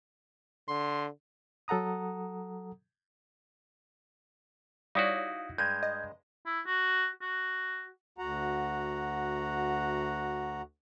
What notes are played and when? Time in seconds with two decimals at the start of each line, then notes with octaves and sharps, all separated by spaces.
0.68 D3 C6
1.68 F#3 A4 F#5 A#5 D#6
4.95 G3 D#4 E4 F#4 C#5 D5 F5 D#6
5.58 G2 G#3 G6 G#6 D#7
5.83 D#5
6.46 E4
6.67 F#4
7.22 F#4
8.18 D2 F#4 F#5 A#5